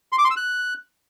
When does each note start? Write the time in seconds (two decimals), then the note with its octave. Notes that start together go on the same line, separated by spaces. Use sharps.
0.12 C6
0.18 D6
0.24 C6
0.31 E6
0.37 F#6